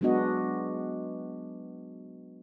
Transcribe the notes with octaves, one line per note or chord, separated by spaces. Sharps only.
F#3 G#3 B3 D4 F#4 D#5